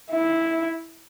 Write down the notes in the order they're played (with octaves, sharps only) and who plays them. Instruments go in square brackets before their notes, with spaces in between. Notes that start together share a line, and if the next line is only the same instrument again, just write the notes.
[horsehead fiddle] E4